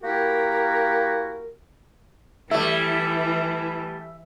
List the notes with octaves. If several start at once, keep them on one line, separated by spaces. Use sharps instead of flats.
A#3 E4 F#4 G4 A#4
E3 G3 A3 E4 E5